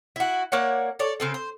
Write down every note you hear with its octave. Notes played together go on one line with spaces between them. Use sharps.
E4 F#4
A#3 C#5 D5 F#5
A4 C#5 D5
C#3 C4 A4
C5